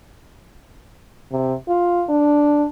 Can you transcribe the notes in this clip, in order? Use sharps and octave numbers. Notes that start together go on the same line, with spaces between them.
C3
F4
D4